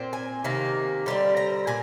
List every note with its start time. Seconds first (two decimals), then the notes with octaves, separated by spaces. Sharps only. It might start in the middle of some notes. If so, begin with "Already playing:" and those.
Already playing: A#2 C4
0.13 G#5
0.44 C3 D#3 A#3
1.06 D3 G3 C4
1.37 A#5
1.67 A#2 G#5